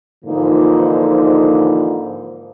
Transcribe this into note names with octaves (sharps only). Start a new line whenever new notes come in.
G#2 D3 E3 F3 A#3 D#4